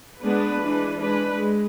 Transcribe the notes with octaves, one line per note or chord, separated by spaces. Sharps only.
G#3 B3 D4 B4
E3 G#3 D4
G#3 D4 B4
G#3